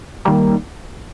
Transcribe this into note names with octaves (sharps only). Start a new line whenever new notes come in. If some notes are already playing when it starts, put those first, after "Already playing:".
D#3 G3 A#3